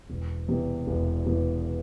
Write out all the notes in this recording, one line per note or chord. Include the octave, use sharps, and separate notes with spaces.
E1
E2 C3
E1
E2 C3